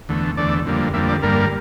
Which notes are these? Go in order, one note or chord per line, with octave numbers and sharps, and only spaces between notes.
E2 D3 A3
E2 D3 A3 D5
F2 D3 G3 A#3
F2 D3 G3 A#3 E5
D5
G2 D3 G3 A#3 A#4